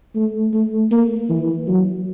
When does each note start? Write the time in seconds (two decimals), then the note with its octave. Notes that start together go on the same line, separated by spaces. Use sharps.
0.15 A3
0.54 A3
0.91 A#3
1.30 E3
1.68 F#3